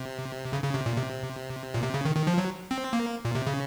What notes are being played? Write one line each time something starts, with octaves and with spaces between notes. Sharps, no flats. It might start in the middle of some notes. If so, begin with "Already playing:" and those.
Already playing: C3
C#3
C#3
C3
A#2
C3
A#2
C3
C#3
D#3
D#3
F3
F#3
C4
A#3
A#2
C3
C#3